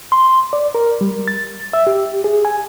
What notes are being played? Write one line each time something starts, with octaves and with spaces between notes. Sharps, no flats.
C6
D5
A#4
G3
A6
E5
G4
G#4
G#5